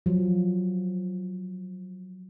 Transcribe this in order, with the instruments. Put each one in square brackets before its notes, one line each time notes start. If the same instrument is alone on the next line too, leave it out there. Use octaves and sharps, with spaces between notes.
[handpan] F3 F#3